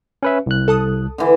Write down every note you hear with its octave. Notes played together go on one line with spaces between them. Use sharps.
C#4 B4 E5
C2 F#6
A4 A5 D#6
D3 E3